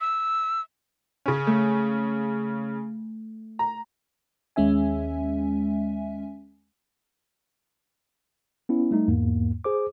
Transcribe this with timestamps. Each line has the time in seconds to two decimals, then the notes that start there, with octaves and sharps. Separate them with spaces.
0.01 E6
1.26 C#3 C#4
1.47 A3
3.59 A#5
4.56 D#2 G#3 C#4 E5 G#5
8.69 B3 C#4 E4
8.91 G3 A3 D#4
9.08 E2 G#2 A#3
9.64 G#4 C5 D6